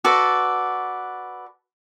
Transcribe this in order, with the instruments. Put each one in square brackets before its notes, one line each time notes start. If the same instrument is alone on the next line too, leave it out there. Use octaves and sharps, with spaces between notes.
[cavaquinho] F#4 A4 B4 D5